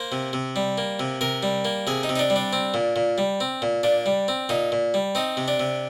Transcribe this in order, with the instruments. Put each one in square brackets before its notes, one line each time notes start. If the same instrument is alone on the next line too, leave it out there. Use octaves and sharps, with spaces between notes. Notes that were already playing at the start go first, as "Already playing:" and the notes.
Already playing: [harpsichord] A#3 C5
C3
C3
G3
A#3
C3
C3 A#4
G3
A#3
C3 G#4
D#4
C3
D#4
D4
G3
D4
C4
A#2
A#2
G3
C4
A#2
A#2 D4
G3
C4
A#2 D#4
A#2
G3
C4 D#4
C3
D4
C3